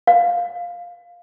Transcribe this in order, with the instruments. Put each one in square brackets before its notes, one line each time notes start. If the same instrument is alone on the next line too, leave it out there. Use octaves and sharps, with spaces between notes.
[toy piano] F5